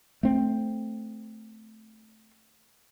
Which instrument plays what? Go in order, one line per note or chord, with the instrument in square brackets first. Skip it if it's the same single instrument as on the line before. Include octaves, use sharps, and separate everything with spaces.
[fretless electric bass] A3 C4